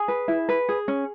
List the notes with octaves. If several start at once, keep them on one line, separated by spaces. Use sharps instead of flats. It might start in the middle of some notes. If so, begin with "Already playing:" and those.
Already playing: G#4 G#5
B4
E4
B4
G#4
C#4